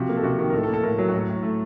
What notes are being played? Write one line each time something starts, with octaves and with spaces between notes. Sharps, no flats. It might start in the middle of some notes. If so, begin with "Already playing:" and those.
Already playing: C3 F3 F#4
A#3
A4
C3 F#4
D#3
A#4
A2 A4
A4
A#3
A4
A2 A#4
F#3 A#4
F#4
A2 A4
A2
A3